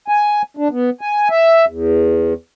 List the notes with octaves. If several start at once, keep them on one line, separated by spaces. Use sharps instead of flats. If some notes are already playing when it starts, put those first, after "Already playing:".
G#5
D4
B3
G#5
E5
E2